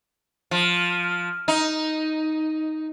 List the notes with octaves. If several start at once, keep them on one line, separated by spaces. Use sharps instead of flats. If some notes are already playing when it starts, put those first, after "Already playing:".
F3
D#4